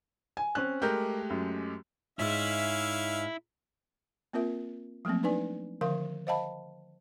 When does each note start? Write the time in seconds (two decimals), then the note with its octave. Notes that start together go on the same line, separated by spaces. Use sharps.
0.37 G#5
0.55 C4 C#4 F#6
0.82 G#3 A3 G4 A#4 G6
1.30 F#2
2.19 G#2 C#4 D#4 E4 E5 F5
4.33 A#3 C4 F4 A#4 E5
5.05 F3 F#3 A3 A#3 C4
5.23 D4 D#4 B4 D5 G#5
5.81 D3 D#3 F3 A#4 F5
6.27 C5 D#5 F5 G5 A5 B5